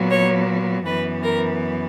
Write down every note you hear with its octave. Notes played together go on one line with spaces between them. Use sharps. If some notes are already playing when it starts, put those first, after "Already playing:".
Already playing: A#2 F#3 B3
C#5
F#2 E3 B3 B4
A#4